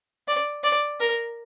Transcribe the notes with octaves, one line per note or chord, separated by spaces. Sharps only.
D5
D5
A#4